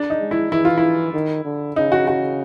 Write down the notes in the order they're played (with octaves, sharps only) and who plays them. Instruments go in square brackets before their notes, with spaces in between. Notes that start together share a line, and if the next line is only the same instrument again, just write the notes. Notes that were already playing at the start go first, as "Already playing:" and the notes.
Already playing: [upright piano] D4
D#4
[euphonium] G#3
[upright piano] E4
[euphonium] E3 [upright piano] E4
[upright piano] F4
E4
[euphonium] D#3
D3
[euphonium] C#3 [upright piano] D#4
[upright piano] F#4
F#4